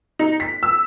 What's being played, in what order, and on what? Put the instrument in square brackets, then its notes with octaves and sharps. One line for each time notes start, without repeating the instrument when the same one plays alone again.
[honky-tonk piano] D#4
B6
E6